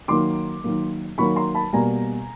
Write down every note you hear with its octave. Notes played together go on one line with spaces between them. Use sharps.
D#3 F#3 A#3 C6 D6
D#3 F#3 A#3
D#3 F#3 A#3 B5 C#6
A#5 C6
A5 B5
B2 G3 A#3 G#5 A#5